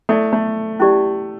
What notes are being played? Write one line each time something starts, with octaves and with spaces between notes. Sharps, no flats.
A3 E4 A4 D5
A3
C#4 E4 G4 D5